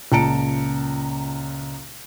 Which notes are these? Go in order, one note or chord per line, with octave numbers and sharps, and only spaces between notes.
C#2 A#2 A5 A#5 C#7 D7